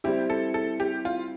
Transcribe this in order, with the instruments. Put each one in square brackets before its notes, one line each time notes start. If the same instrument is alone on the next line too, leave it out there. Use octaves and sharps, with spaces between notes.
[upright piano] G3 C4 E4 [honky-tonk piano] G4
[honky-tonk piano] A4
A4
G4
F4